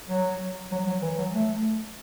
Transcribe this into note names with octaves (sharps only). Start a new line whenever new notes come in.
F#3
F#3
F#3
E3
F#3
A3